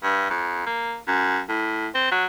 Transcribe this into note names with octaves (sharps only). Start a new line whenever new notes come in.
G2
F2
A#3
F#2
A2
C4
F#3